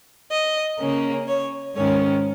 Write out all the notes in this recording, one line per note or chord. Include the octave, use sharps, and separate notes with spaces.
D#5
C#3 A#3 C#4
C#5
G#2 D#3 C#4 C#5